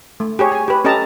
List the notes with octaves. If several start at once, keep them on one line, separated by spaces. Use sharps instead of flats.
A3
G4 G#4 C#5
G#5
G4 B4
C#4 G4 A4 D#5 A5 A#5